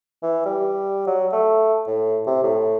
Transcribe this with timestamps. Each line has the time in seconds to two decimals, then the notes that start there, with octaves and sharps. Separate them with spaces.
0.23 E3
0.45 G3
1.07 F#3
1.32 A3
1.87 A2
2.27 C3
2.43 A2